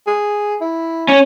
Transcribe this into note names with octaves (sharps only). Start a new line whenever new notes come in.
G#4
E4
C#4